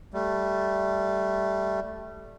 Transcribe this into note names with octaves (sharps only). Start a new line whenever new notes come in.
G3 A3